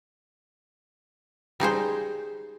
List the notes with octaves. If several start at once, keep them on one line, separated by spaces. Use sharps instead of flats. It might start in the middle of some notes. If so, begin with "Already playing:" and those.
G3 D#4 G#4 C5